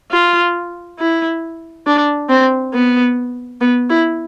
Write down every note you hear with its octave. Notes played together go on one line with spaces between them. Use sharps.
F4
E4
D4
C4
B3
B3
E4